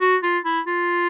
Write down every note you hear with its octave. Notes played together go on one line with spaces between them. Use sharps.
F#4
F4
E4
F4